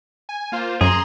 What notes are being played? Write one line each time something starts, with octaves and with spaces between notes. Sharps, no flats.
G#5
A#3 F4 C5
F#2 G#4 A#5 C6